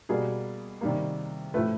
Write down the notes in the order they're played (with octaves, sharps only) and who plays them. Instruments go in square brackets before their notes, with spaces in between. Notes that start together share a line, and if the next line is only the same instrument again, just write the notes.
[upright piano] B2 G3 A#3 G#4
C3 D#3 G3 A#3
A2 F3 A3 B4